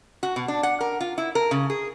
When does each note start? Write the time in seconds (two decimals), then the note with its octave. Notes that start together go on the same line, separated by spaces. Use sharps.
0.23 F#4
0.36 B2
0.48 D4
0.63 F#5
0.80 A#4
1.01 F4
1.18 E4
1.35 A#4
1.51 C#3
1.70 G#4